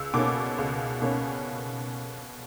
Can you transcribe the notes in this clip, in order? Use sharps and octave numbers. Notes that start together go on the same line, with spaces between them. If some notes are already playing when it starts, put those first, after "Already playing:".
Already playing: C#2 E6
B2 A#3 C#4 D6
C#2
B2 A#3 C#4